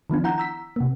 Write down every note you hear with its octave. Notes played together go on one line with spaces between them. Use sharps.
D#3 F3 B3 D4
E4 F#5 A#5 G6
A#5 E6 B6
C3 A#3